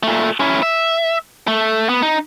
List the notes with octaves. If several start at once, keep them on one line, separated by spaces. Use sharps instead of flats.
A#2 A3
C#4 E4
E5
A3
B3
D#4